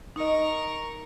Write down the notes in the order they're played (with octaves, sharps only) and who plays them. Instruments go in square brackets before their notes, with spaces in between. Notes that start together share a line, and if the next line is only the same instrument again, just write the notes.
[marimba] D#4 D#5 [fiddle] A#4 C#6